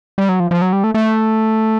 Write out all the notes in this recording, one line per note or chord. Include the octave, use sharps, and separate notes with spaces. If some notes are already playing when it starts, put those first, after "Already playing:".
G3
F#3
F3
F3
F#3
G3
A3
A3